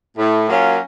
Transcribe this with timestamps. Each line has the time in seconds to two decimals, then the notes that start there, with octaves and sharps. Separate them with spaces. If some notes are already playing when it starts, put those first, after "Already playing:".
0.17 A2
0.48 F#3 A#3 C#4 F4